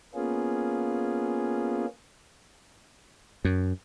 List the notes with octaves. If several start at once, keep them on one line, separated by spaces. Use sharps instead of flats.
A#3 B3 C#4 F4 G#4
F#2